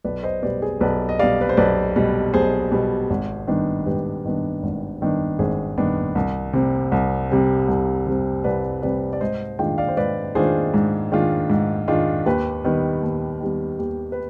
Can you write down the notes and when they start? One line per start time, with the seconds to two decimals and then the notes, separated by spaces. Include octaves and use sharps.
0.04 B1 B4 D5
0.23 C5 D#5
0.43 B2 G3 B4 D5
0.62 G#4
0.81 B1 B4 D5
1.09 D#5
1.19 B2 G3 D5 F5
1.41 B4
1.49 C5
1.57 B1 B4 D5
1.96 B2 G3
2.33 B1 G#4 C5
2.71 B2 G3
3.10 G#1
3.48 G2 D#3 B3 D4
3.86 G#1 G4 B4
4.24 G2 D#3 B3 D4
4.63 G#1
5.01 G2 D#3 B3 D4
5.39 G#1 G#4 C5
5.78 G2 D#3 B3 D4
6.15 C2
6.53 C3 G3 C4
6.92 C2
7.30 C3 G3 C4
7.68 C2
8.06 C3 G3 C4
8.44 C2 B4 D5
8.82 C3 G3 C4 B4 D5
9.13 D5
9.21 G#2 C5 D#5
9.59 D#3 G#3 D4 F4 D#5 G5
9.78 D5 F5
9.89 C5
9.97 G#2 B4 D5
10.35 D#3 G#3 D4 F4 G#4 C5
10.74 G#2
11.12 D#3 G#3 D4 F4
11.50 G#2
11.88 D#3 G#3 D4 F4
12.26 D#2 G4 B4
12.64 D#3 G3 B3
13.02 D#2
13.41 D#3 G3 B3
13.79 D#2 G4
14.12 B4